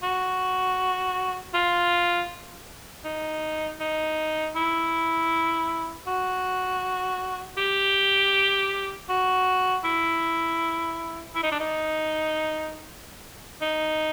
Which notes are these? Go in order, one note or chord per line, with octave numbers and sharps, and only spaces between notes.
F#4
F4
D#4
D#4
E4
F#4
G4
F#4
E4
E4
D#4
D4
D#4
D#4